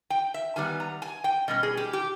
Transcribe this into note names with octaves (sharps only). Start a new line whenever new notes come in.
G5
E5
D#3 G3 B3 G#5
A#5
G#5
G5
B2 G3 C#4 D#5
G#4
G4
G4